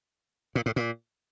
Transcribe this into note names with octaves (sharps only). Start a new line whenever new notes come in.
A#2
A2
A#2